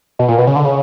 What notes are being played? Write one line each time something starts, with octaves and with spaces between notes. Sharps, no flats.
B2
A#2
B2
C#3
D3
C#3